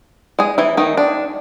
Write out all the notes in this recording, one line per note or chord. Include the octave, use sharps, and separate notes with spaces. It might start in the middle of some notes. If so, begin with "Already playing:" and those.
G#3 G#4
E3 E4
D#3 D#4
D4